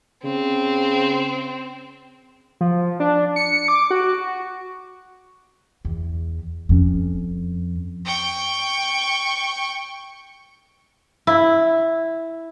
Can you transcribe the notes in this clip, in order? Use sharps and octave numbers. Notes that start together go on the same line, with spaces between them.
C#3 C4
F3
D4
C#7
D6
F#4
E2
F2 C#4
G5 C#6
E4